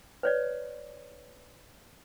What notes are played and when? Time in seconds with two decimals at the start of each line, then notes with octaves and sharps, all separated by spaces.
0.23 B4 C#5 D5